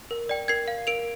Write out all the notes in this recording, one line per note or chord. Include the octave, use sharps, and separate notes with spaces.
A#4
D5 G5
A#4 G#6 C7
F5
A#4 D7 F7